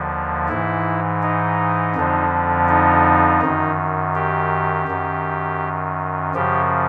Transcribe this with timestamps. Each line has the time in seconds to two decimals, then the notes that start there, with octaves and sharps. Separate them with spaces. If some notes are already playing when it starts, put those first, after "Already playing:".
Already playing: D#2 D3 F3
0.49 G#2 E3 E4
1.23 D#4
1.96 F2 D3 F3
2.69 D#4
3.42 F#2 D#3
4.15 G4
4.88 F#2 D#3
6.34 F#2 C#3 F3 G4